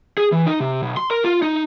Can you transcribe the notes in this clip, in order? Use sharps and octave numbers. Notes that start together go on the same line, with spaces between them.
G#4
E3
D#4
C3
B1
C6
A#4
F4
D#4